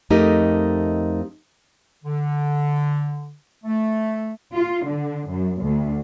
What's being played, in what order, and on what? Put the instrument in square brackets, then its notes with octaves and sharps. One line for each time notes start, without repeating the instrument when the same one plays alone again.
[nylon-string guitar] F2 A3 D#4 G4 A#4 D#5
[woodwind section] D3
A3
[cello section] F4
D3
F#2
D2